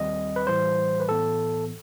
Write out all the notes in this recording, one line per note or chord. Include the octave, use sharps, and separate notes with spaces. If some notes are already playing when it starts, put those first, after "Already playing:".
Already playing: D#2 D#3 G3 C4 D#5
B4
A2 E3 G3 C5
B4
A2 E3 B3 A4